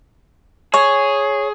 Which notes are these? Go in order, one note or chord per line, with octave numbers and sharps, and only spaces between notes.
G#4 C#5